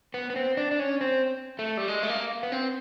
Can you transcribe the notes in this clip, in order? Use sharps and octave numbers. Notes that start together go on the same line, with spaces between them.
B3
B3
C4
D4
D4
C#4
C4
A3
G3
G#3
A3
A#3
B3
C4